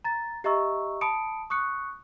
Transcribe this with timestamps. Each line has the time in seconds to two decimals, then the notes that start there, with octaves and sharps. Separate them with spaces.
0.04 A#5 A6
0.44 G4 D#5 E5 A#5 C#6 E6
1.01 A5 B5 D#6 C#7 D7
1.50 C#6 D#6 F#6 C#7